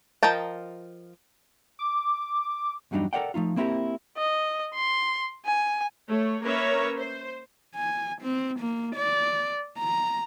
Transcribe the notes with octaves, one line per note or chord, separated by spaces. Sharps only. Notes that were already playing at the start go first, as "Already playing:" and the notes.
F3 A#4 D#5 G5 A5
D6
E2 G2 F#3 G3 D4 D#4
A4 A#4 C#5 D5 F#5 G5
F3 A3 D#4 F4
A#3 C4 E4 F4 G4 A#4
D#5
C6
G#5
A3 C#5
A#3 C#4 A#4 B4 C#5 E5
C5
G#5
C4
A#3
D5
A#5